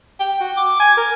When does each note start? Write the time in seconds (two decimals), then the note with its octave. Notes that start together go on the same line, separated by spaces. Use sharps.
0.20 G5
0.41 F#4
0.57 D6
0.80 G#5
0.97 A#4